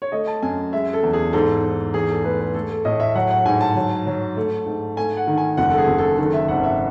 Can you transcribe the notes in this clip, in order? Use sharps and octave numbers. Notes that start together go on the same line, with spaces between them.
C#5
A3 D#5
A5
F#2 G#5
G#3 E5
A4
E2
G#4
G#2 A4
G#2
E2 G#4
A4
A3 B4
B4
A3 A4
A4
A2 D#5
E5
F#3 F#5
F#5
G#2 G#5
A5
F#3
F#3
A3
G#2
A3 G#5
F#5
D#3
G#5
F#1 F#5
A4
G#4
F#1
A4
D#3 A4
E5
G#1 F#5
E5